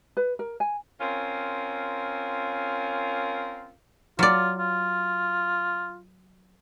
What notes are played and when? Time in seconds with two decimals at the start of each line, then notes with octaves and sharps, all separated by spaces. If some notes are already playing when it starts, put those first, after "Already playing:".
0.17 B4
0.39 A#4
0.60 G#5
1.00 C4 C#4 F4 A#4
4.19 F#3 F4 D5
4.59 F4